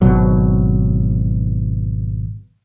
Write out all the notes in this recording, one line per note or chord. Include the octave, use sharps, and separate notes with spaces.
G#1 B2 F#3